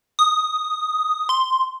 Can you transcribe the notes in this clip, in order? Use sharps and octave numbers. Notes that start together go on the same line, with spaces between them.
D#6
C6